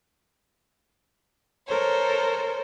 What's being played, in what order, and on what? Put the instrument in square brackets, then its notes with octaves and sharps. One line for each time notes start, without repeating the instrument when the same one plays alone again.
[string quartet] A4 A#4 C5 C#5